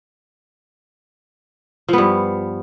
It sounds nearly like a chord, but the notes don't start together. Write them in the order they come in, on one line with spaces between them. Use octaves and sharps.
F3 B3 G2